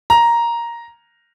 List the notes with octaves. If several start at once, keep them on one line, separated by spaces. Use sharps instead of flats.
A#5